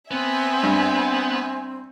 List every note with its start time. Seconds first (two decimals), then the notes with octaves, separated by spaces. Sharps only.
0.11 B3 C4 E5 G#5
0.63 G2